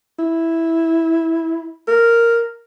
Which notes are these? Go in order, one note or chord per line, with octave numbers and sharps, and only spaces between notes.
E4
A#4